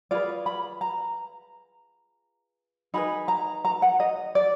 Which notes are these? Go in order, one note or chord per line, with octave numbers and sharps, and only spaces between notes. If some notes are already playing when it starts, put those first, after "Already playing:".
F4 G#4 B4 D5
B5
A#5
D#4 G#4 B4 B5
A#5
A#5
F#5
D#5
D5